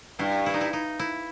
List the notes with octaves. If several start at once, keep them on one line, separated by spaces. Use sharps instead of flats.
G2 E4
E4
D#4
E4
D#4
E4